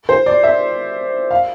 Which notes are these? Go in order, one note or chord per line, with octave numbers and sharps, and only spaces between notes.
C5
D5
E5
F5